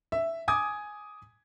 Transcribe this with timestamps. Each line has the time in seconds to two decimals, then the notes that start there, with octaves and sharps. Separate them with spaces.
0.12 E5
0.48 G#5 D6 D#6 G#6